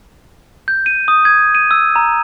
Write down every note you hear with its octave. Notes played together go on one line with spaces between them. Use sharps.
G6
D#7
D#6
G#6
D#7
E6
A#5